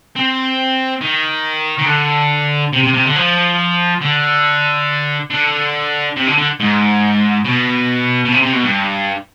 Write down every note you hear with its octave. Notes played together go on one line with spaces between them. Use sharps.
C4
D#3
D#3
D3
C3
C3
C3
D3
F3
D3
D3
C3
D3
D3
G#2
B2
B2
C3
C3
B2
G2